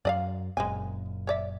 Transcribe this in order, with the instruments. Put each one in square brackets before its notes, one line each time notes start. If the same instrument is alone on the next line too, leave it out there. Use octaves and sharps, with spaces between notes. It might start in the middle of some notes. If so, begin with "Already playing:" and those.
[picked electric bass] F#2 F#3 [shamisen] D5 D#5 F5
[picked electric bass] F#1 F#2 A#2 [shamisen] G#3 C4 G#5
[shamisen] C#5 D5 E5